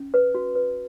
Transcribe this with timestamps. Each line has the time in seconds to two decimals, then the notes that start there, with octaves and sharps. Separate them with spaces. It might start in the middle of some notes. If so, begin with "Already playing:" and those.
Already playing: C#4
0.14 B4
0.35 F#4
0.55 B4